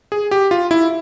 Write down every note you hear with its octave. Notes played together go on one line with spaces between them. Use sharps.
G#4
G4
F4
E4